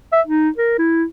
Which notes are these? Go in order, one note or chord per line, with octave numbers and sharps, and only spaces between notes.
E5
D#4
A#4
E4